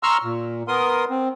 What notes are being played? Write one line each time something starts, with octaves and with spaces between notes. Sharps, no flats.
A#5 C6 C#6 E6 F6
A#2
B3 A#4 C6 D#6
C4